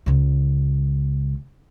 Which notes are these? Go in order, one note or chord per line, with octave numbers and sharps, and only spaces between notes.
C#2 C#3